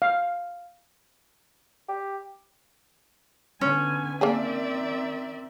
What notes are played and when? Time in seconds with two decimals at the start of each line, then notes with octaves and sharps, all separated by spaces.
0.02 F5
1.88 G4
3.61 D3 B3 C#4 G#5
4.21 D#3 A#3 C4 D4 G#4 D5 E5